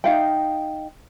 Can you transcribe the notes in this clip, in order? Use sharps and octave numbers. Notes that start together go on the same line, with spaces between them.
D#4 F5 G5